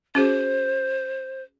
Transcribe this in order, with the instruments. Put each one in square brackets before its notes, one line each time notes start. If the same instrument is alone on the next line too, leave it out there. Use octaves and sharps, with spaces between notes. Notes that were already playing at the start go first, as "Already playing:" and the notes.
[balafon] C#4 F#4 G#4 [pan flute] C5